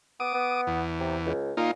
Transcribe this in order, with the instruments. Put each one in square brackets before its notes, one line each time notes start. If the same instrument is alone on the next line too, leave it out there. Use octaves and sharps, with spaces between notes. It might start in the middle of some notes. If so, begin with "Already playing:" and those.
[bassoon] B3 [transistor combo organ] D6 D#6
[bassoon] B3
[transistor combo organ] E2
[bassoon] C3
C#2
[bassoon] A#2 [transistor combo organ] A#3 D#4 F4